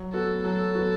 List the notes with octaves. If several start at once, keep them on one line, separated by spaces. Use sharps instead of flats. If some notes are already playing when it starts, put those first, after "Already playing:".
Already playing: F#3
B3 F#4 A4
F#3 A4
B3 F#4